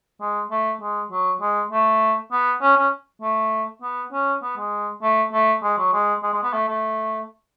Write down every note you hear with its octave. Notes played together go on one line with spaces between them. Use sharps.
G#3
A3
G#3
F#3
G#3
A3
B3
C#4
C#4
A3
B3
C#4
B3
G#3
A3
A3
G#3
F#3
G#3
G#3
G#3
B3
A3
A3